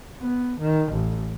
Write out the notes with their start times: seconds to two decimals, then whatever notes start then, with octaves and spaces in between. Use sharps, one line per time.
0.20 B3
0.61 D#3
0.93 A1